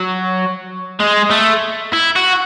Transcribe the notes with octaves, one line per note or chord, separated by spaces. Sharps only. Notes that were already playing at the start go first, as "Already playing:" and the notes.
Already playing: F#3
G#3
A3
E4
F#4